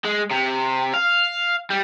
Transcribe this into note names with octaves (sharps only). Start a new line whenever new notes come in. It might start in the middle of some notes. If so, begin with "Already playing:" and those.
G#3
C3
F5
G3